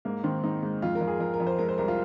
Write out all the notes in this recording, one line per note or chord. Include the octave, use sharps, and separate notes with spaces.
G#2 A#3
D#3 C4
G#2 D#4
G#2
F2 F4
A#4
F2
G#4
F2 A#4
A#4
F2
C5
G#3 A#4
C5
C2 A#4
F4